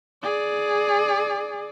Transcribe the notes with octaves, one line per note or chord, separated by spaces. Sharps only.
G#4 D5